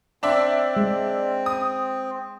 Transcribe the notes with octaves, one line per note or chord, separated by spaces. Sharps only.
C4 D4 D5 E5
G#3
D#6